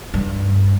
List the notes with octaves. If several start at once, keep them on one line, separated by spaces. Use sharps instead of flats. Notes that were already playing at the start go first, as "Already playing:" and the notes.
G2